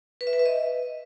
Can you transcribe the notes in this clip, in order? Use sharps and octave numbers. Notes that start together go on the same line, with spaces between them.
B4
E5
B4
E5
D#5